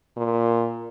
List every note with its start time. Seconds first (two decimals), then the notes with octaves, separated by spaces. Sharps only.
0.17 A#2